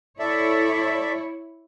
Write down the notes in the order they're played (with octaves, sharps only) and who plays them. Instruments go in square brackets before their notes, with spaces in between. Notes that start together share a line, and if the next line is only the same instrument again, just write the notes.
[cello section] E4 C#5 [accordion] A4 D5 E5